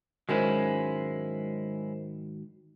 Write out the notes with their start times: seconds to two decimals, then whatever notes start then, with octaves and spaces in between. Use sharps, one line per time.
0.29 G#2 D#3 F#3 G#3 C#4 E4 A#4 C5